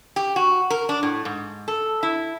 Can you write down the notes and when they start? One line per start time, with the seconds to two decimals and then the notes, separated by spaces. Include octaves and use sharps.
0.16 G4
0.36 F#4
0.70 A#4
0.89 D4
1.03 A2
1.25 G#2
1.68 A4
2.03 E4